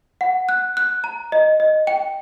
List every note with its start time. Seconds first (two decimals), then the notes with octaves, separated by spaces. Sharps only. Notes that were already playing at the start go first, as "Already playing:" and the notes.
0.21 F#5
0.49 F#6
0.77 F#6
1.04 A#5
1.32 D#5
1.60 D#5
1.87 G5